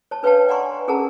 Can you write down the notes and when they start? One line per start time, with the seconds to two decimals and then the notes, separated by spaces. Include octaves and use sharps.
0.11 C#5 A5
0.23 D4 B4 C#5 F5 G5 A5
0.48 D5 F#5 G#5 A#5 C6 C#6
0.88 C#4 G#4 A#4 F#5 A5 A#5